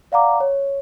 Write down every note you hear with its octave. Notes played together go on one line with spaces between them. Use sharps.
D5 F5 F#5 A#5 D6
C#5